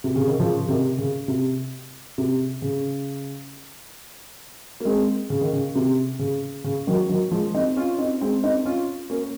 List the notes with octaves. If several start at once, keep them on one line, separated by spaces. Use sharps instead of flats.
C3
C#3
D#3
C#3 F3
C#3
C3 D#3
C#3
C3
C3
C#3
A#3
G#3 C4
C#3
D#3
C#3
C3
C#3
C#3
D#3 F#3
D#3 F#3
F3 G#3
C4 D#4
C#4 F4
C4 D#4
G#3 C4
C4 D#4
C#4 F4
A#3 C#4